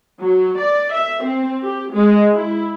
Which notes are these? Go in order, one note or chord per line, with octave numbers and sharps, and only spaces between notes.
F#3
D5
E5
C4
G4
G#3
E4